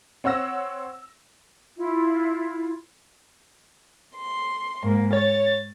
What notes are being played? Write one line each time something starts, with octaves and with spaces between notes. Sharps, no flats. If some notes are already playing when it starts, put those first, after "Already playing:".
C4 C#5 F#5 E6 A#6
E4 F4
C6
G#2 A#3
C#5 A6